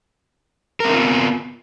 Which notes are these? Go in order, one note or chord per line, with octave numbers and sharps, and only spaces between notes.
B3 C4 D#4 F4 A#4